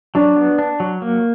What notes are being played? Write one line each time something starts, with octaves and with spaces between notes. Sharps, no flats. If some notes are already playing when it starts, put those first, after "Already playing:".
F#3 D4
B3
D4
F#3
A#3